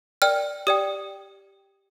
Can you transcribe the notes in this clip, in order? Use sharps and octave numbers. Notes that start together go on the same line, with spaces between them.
A#4 D5 G5 F6
G4 D5 G5 D#6